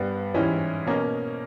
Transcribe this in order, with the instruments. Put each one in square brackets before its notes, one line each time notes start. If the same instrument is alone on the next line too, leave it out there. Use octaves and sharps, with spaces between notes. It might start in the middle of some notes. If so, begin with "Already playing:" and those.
Already playing: [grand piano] G2 G3 B3
G#2 E3 G3 C#4 E4
B2 A#3 C#4